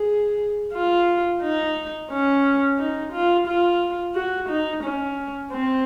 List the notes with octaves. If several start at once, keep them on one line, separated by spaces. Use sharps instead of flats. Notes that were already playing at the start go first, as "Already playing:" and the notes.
Already playing: G#4
F4
D#4
C#4
D#4
F4
F4
F#4
D#4
C#4
C4